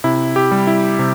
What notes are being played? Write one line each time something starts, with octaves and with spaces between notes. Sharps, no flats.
C3 E4
G4
G3
E4
C3